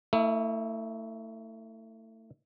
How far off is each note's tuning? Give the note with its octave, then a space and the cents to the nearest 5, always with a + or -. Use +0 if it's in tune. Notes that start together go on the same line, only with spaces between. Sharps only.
A3 +30 E4 -30